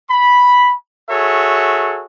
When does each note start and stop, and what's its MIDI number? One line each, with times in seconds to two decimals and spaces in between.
0.10 0.74 83
1.09 2.05 66
1.09 2.05 68
1.09 2.05 69
1.09 2.05 73
1.09 2.05 76